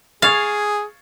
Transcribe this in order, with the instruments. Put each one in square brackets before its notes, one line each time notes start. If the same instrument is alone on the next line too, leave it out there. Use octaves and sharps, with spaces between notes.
[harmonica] G#4 [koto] F5 [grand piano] C#6 G#6 A6